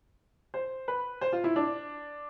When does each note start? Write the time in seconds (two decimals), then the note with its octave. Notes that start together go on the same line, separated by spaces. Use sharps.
0.54 C5
0.88 B4
1.21 C5
1.33 F4
1.44 E4
1.56 D4